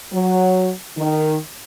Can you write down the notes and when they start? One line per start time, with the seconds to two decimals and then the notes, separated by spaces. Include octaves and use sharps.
0.12 F#3
0.97 D#3